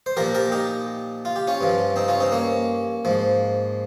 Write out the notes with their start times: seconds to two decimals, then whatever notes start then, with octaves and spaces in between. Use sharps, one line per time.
0.06 C5
0.17 A#2 F3 G4 A#4
0.34 G4 A#4
0.52 D#4 G4
1.25 F4
1.36 G4
1.47 C#4 F4
1.61 G2 F3
1.96 C4 D#4
2.08 C#4 F4
2.20 C4 D#4
2.32 A#3 C#4
3.05 G#2 F3